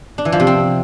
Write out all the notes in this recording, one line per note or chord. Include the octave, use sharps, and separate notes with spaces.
D4
E3
F3
C3
C4